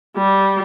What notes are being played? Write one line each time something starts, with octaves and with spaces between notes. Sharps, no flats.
G3